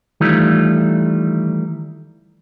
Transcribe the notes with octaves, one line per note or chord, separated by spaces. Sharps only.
D#3 E3 G3 A3 F4